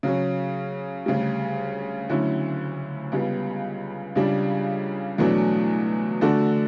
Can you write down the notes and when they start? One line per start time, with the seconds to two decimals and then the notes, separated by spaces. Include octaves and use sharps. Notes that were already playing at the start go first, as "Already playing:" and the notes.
0.03 C#3 F#3 C#4
1.06 D2 C#3 G3
2.09 D2 D3 F#3 C#4 E4
3.12 C#2 C#3 G3 B3
4.15 C#2 C#3 G3 D4
5.18 E2 B2 F#3 A3 D4
6.21 D3 A3 D4 F#4 A4